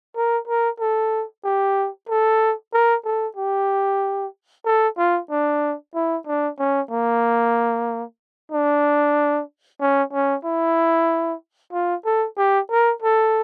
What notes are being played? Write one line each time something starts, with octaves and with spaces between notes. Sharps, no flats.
A#4
A#4
A4
G4
A4
A#4
A4
G4
A4
F4
D4
E4
D4
C#4
A#3
D4
C#4
C#4
E4
F4
A4
G4
A#4
A4